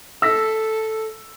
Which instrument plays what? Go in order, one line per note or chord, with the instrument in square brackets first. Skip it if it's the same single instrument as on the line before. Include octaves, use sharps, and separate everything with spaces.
[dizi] A4 [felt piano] E6 A#6 B6